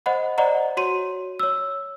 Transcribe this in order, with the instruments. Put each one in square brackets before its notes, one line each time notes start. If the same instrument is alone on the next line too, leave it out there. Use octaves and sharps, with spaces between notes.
[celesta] C5 D#5 F#5 B5
C5 D5 D#5 F#5 A#5
F#4 C#5 C6 D#7
C#5 E6